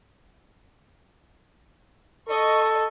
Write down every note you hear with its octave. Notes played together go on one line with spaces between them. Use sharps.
A4 D#5 C#6